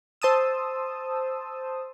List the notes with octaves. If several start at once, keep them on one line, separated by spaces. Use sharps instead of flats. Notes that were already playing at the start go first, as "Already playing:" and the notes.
C5 A5 D#6 E6